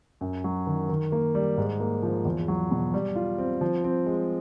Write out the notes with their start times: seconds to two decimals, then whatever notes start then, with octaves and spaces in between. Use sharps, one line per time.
0.21 F#2
0.44 F#3
0.67 D#3
0.89 D#3
1.12 A#3
1.35 G3
1.58 G#2
1.80 A#3
2.03 F3
2.25 E2
2.48 F#3
2.71 B2
2.94 G3
3.16 F4
3.38 C4
3.61 F3
3.84 C4
4.06 G#3